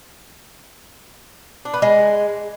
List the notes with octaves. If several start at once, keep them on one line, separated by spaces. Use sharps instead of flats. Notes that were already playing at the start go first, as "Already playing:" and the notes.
D4
B3
G#3